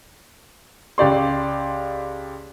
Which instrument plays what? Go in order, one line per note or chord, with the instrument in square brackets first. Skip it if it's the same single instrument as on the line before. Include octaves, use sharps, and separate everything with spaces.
[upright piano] C#2 G4 D5 C6